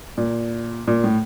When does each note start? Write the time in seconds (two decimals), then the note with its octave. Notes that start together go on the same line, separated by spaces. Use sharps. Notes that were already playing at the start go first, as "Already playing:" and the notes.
0.18 A#2
0.87 A#2
1.04 A2